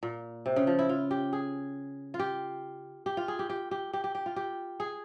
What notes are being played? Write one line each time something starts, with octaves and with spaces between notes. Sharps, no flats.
A#2
C3
C#3
F3
E4
F4
G4
G#4
F4
G4
G4
F4
G#4
G4
G4
G4
G4
G4
G4
F4
G4
G#4